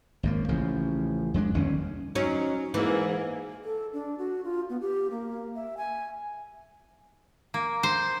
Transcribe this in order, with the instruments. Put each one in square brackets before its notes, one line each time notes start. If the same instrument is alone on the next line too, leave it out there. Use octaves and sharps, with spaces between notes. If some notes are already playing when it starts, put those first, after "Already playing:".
[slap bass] G#1 F#2 A#3
A1 C#3 F3
F2 G#3 D4
G1 D#2 B2 C#4
[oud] F#3 C#4 [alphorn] D#4
[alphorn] G#2 [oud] E3 [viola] A#3 G#4
[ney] A4
D4
F#4
F4
B3
G4
A#3
E5
G#5
[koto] A#3
C5